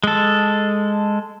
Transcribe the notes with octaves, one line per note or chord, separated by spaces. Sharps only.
G#3 A4